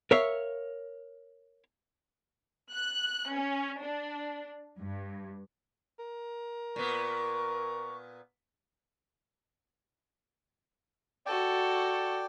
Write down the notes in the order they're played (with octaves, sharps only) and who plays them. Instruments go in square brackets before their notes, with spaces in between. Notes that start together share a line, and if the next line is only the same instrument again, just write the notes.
[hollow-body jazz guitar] A#4 C#5 E5 F5
[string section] F#6
C#4
D4
G2
[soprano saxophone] A#4
[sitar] A#2 B3 [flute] C#6
[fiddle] F#4 A4 [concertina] D5 G5